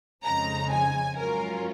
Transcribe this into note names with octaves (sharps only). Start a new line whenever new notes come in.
F2 C#3 F3 G#3 D#4 A#5
G#5
G#2 F#3 C#4 F4 A#4